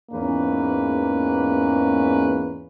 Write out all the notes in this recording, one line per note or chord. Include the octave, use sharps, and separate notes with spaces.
E2 G#2 A#3 C#4 B4